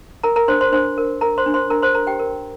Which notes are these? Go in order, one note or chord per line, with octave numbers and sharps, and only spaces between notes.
A#4 A#5
A#4 A#5
D4 C5 C6
C5 C6
D4 C5 C6
A#4
A#4 A#5
C5 C6
D4
C5 C6
D4 A#4 A#5
C5 C6
A#4 A#5
G4 G5
A#4